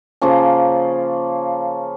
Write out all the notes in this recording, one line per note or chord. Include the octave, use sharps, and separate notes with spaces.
C#3 F3 A#3 C#4